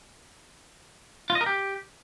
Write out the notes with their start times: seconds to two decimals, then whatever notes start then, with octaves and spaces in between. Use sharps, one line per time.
1.30 F4
1.35 D#5
1.41 A#4
1.46 G4